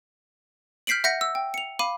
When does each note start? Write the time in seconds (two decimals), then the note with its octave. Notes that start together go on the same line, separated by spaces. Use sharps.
0.87 F6 G6 B6 C7 D7 F#7
1.04 E5 F#5 G6 A#6 C#7
1.21 E6
1.35 G5
1.54 C#7 F7
1.79 F5 B5 D6 D#7